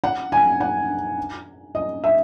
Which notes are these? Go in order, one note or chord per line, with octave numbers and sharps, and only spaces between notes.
F#5
G#5
F#5
D#5
E5